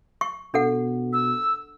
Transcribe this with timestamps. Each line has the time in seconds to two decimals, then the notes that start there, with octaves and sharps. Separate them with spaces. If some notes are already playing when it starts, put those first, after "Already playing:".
0.21 C#6
0.54 B2 D4 A4 F#5
1.13 E6